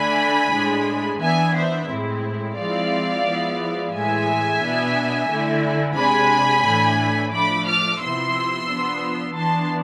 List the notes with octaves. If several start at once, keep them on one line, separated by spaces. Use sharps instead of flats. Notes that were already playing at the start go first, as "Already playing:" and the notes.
Already playing: D3 A3 D4 G#5 B5
A2 G#3 D4
E3 B3 D4 E5 G#5
C5 E5
A2 G#3 C4 E4
F3 G#3 C4 E4 D5 F5
F3 G#3 B3 E4
A2 E3 G#3 E5 G#5
B2 B3 D4
D3 A3 E4
C3 G#3 D4 G#5 B5
A2 E3 A3 D4
F3 A3 D4 B5 D6
D6 F6
C3 F3 B3 E4 C6 E6
F3 B3 D4
E3 B3 D4 A5 C6